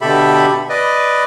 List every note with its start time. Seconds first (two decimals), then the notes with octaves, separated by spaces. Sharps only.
0.01 B2 D3 G4 A4 E5 B5
0.69 B4 D5 D#5